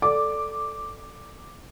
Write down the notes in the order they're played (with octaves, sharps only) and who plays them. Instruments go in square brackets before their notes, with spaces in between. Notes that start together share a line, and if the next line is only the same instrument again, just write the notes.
[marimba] A4 D5 [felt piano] D6